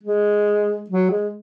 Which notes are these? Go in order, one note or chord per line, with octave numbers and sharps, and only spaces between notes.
G#3
F#3
G#3